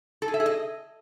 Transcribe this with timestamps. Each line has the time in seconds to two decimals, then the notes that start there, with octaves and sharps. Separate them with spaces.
0.22 A4
0.28 G#4
0.34 E5
0.40 G#4
0.46 D#5